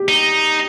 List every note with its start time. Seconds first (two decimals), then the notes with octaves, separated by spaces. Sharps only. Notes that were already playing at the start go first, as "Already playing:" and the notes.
Already playing: G4
0.08 D#4